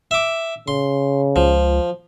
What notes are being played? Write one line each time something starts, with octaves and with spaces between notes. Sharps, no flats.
E5 D6
C#3 C6
C#2 F3